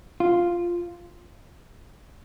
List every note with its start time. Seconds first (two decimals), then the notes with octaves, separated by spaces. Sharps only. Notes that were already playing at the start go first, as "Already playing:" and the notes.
0.20 F4